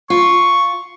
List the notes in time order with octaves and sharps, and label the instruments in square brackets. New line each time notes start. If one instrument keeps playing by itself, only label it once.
[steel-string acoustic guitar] F4 [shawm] C#6